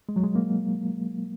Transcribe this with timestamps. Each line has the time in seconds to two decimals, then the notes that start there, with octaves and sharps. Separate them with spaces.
0.09 G#3
0.16 F#3
0.23 G#3
0.35 A#3